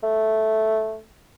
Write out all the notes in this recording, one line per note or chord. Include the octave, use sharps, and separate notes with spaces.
A3